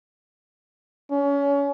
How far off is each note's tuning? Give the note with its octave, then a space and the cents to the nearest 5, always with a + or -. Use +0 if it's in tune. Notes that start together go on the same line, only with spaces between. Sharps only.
C#4 +30